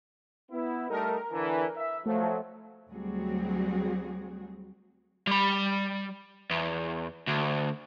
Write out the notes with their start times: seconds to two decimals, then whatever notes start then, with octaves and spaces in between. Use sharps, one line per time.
0.52 B3 E4
0.90 G3 A3 D#4 A#4
1.32 D3 E3
1.77 E5
2.06 F3 F#3 A3
2.90 D2 F#3 G3 C4 F#4 G#4
5.27 G3 B5
6.51 E2
7.27 D2